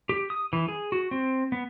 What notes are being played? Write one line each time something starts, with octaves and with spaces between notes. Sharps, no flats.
G4
D#6
E3
G#4
F#4
C4
B3